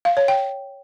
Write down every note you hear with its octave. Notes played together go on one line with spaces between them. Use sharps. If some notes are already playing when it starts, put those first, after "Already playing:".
F5
C#5
G5